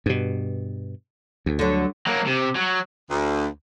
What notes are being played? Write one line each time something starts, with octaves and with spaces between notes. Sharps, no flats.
G2 B2
D2
D3 F#3
F#3 A#3
C3
F#3
D2